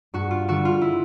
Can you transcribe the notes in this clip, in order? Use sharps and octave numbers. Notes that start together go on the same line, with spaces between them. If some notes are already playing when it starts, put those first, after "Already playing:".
G2 F#4
F4
D3 G3 F#4
F4
E4